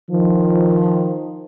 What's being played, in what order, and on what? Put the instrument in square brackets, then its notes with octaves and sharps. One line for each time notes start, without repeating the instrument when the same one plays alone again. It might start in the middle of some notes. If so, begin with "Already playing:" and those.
[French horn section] D#3 F3